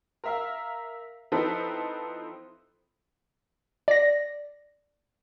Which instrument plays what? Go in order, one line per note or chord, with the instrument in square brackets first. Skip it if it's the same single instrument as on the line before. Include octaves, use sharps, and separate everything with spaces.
[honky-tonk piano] A#4 E5 F5
F3 C4 D#4 E4 A4 B4
[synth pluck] D5 A#6